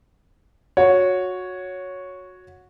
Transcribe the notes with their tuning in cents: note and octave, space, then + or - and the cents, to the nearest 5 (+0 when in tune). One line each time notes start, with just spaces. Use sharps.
F#4 -20 C#5 +0